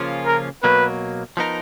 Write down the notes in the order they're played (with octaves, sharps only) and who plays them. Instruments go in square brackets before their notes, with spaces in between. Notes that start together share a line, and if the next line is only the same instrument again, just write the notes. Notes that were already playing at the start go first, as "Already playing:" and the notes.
Already playing: [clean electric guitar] C#3 F3 A#3 C#4 F4
[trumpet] A#4
[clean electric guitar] B2 F#3 A#3 [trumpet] B4
[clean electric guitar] F3 B3 D#4 A#4